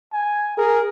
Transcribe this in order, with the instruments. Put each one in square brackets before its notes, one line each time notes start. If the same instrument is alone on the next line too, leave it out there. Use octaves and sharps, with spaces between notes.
[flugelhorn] G#5
[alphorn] G#4 [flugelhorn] A#4